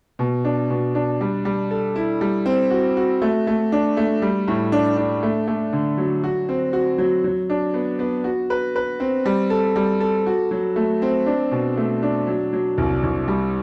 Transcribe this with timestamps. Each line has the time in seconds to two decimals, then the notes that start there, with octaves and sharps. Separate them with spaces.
0.19 B2
0.45 D4
0.70 B2
0.95 D4
1.21 G3
1.45 G3
1.71 A4
1.96 E4
2.21 G3
2.46 C4
2.71 F#4
2.97 F#4
3.22 A3
3.47 A3
3.72 D4
3.97 A3
4.22 G3
4.48 A2
4.72 D4
4.97 D4
5.23 A3
5.48 A3
5.73 D3
5.98 F#3
6.24 F#4
6.49 C4
6.73 F#4
6.98 F#3
7.24 F#3
7.50 D4
7.74 B3
7.99 B3
8.24 F#4
8.50 B4
8.76 B4
9.00 C4
9.26 G3
9.50 A4
9.76 G3
10.00 A4
10.26 F#4
10.51 F#3
10.76 A3
11.02 C4
11.26 D4
11.52 B2
11.77 A3
12.03 D4
12.27 F#3
12.53 F#3
12.78 C2
13.03 C2
13.28 G3